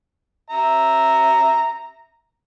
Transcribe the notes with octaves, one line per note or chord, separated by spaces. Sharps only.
E5 A#5